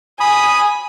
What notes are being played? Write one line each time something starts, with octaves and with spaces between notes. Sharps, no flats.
G#5 B5 D#6